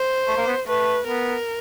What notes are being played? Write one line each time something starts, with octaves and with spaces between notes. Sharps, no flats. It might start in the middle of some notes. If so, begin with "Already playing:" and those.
Already playing: C5
A3
A#3
B3
A3 B4
B3 A#4